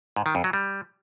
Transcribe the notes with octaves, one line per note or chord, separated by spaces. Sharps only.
G#2
D#3
F2
F#3
G3